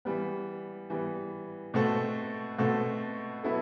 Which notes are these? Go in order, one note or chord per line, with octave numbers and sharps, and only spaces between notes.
E3 G3 B3
E3 G3 B3
B2 A3 C4 F#4 A4
B2 A3 C4 F#4 A4
F#3 B3 E4 A4